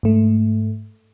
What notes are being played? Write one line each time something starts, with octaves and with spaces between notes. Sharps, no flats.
G#2 A3